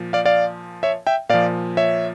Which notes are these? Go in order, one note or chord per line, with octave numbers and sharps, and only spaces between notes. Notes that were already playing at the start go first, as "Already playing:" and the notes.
Already playing: A#2 F3
D5 F5
D5 F5
C#5 E5
E5 G5
A#2 F3 D5 F5
C#5 E5